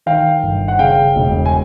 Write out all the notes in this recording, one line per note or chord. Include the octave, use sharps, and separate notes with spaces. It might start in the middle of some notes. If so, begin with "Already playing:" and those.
D#3 F5 G5
G1
F#5
C#3 F5 G5
E1
G#5